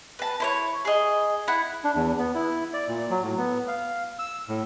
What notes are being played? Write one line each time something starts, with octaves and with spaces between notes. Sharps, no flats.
B4 A5
E4 C5 C#5
G#4 D#5
E4 F#5
D4
E2
B3
E4
D5
A#2
F#3
A2
B3
F5
E6
A2